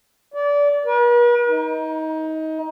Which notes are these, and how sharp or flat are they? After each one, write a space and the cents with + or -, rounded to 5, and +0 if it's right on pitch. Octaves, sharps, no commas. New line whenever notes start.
D5 -25
B4 -45
D#4 +25